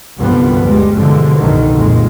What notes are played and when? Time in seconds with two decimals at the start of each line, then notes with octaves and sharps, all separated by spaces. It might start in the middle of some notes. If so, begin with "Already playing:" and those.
0.18 C2 G2 D3 F3 G3 B3
0.64 G1 D2 G3 G#3
0.96 G2 B2 D3 E3 F3 G#3
1.40 C2 G2 B2 D3 D#3
1.75 F2 A#2 G#3